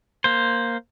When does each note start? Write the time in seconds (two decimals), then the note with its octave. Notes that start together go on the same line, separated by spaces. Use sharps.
0.24 A#3 C5